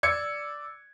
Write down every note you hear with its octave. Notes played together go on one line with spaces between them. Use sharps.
D5 E6 G#6 C#7